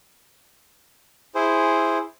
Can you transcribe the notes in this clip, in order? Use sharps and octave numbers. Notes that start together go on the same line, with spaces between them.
E4 G#4 C5